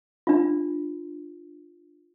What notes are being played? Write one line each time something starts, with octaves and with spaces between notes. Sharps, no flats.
D4 F4